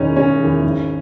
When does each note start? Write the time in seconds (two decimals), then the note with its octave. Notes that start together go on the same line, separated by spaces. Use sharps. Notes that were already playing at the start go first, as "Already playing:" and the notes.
Already playing: E1 E2 D#3 C#4 D#4
0.16 E1 C#4
0.40 E2 D#3
0.63 G#1